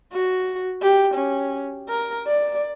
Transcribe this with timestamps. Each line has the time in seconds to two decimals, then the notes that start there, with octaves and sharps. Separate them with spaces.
0.13 F#4
0.82 G4
1.15 C#4
1.89 A#4
2.27 D5